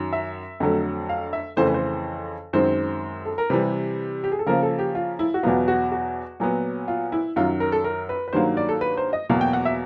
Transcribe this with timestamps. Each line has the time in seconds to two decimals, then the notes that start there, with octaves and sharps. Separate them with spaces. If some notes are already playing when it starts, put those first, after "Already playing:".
Already playing: F#2 D#3 F#3
0.13 E5
0.60 F2 D3 F#3 A3
1.09 F5
1.33 E5
1.57 F2 C#3 E3 A3 C5
1.66 B4
1.74 C5
2.53 F#2 D#3 G#3 C4 C5
3.25 A4
3.38 A#4
3.50 C3 E3 G3 B4
4.24 G4
4.32 G#4
4.39 A4
4.46 C#3 F3 A#3 A#4
4.63 A4
4.79 G4
4.95 F4
5.19 E4
5.34 F#4
5.43 E2 B2 F#3 B3 F4
5.68 F#4
5.92 F#4
6.40 A#2 F#3 B3
6.88 F4
7.12 E4
7.36 F#2 D#3 F#3 F4
7.60 A#4
7.72 A4
7.84 A#4
8.09 B4
8.28 B4
8.33 G2 D#3 F#3 A#3 C5
8.57 D5
8.69 A4
8.81 B4
8.97 C5
9.13 D#5
9.30 E2 B2 F#3 A#3 F5
9.41 G5
9.53 F#5
9.65 E5